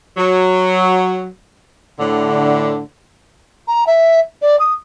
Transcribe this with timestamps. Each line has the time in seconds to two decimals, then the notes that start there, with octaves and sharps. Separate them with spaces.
0.18 F#3
1.99 A2 D3
3.68 A#5
3.87 E5
4.42 D5
4.59 D#6